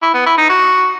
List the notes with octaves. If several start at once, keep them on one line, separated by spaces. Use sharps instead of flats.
E4
B3
E4
D#4
F#4